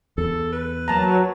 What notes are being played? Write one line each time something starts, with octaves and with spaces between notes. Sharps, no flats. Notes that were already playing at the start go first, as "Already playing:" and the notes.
E2 A4
B4
F#3 A#3 A5 A#5